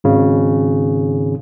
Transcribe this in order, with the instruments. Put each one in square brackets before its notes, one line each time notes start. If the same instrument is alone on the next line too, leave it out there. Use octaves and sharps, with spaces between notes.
[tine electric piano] G#1 C#3